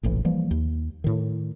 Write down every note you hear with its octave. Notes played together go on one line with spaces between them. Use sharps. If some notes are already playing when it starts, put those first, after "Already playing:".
F1 A#1 A2 E3
E3 F3 G3 A#3
D#2
A2 D#3